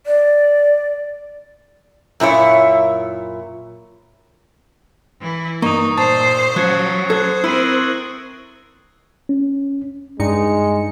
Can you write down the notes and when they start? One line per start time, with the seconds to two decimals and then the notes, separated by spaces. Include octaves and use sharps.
0.06 D5
2.20 F#2 A#2 E4 C#5
5.21 E3 E4
5.62 G2 A#3 D#4 C#6 D#6
5.98 A#2 C5 A5 A6 C7
6.56 F3 F#3 C#4 F#6 G#6 C#7
7.10 A4 C5 F#6 G#6
7.44 C4 E4 A#4 E6 D#7 F#7
9.29 C#4
10.19 G2 G#3 D#4 C#7